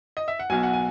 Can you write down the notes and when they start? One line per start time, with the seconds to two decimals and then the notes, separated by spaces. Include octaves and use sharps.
0.17 D#5
0.28 E5
0.39 F#5
0.50 B1 B2 F#3 G#5
0.63 F#5
0.73 G#5